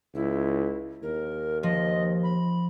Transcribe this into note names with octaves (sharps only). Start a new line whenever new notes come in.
C#2 E4
D#2 A#4
F3 D#5
B5